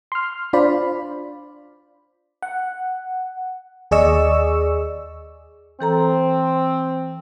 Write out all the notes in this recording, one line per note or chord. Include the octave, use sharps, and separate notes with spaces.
C6 F6
D4 F4 C5 D5 B5
F#5
D#2 G#4 D5 D#5 C#6 E6
E3 C4 A4 A#5